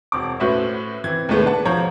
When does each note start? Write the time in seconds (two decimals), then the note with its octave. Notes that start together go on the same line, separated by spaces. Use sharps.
0.12 E1 C4 D6
0.40 A2 C#4 F#4 B4 C5 E5
1.04 E3 C4 G#6
1.29 D#2 A2 G#3 A3 B3
1.45 D4 B4 F#5 A5
1.65 E1 F3 C5 C#5 A#5 G#6